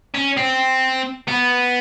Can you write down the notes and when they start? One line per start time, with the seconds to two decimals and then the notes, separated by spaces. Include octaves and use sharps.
0.14 C#4
0.37 C4
1.28 B3